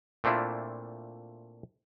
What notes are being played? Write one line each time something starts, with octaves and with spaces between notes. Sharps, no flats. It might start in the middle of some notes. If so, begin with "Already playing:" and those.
A#2 A3 C4 D4 E4 F4